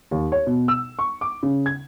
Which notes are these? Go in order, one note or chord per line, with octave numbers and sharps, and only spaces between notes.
D#2
C#5
B2
E6
C#6
D6
C#3
G#6